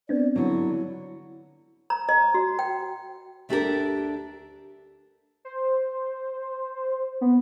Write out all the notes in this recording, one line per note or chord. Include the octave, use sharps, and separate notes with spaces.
B3 C4 D4 D5
D3 F#3 E4
A#5
D#5
F#4
G5
D2 A3 D4 G4 A4 A#4
C5
B3